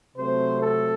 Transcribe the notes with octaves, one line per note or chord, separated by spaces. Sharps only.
C3 F#3 A3 C4 C5
A4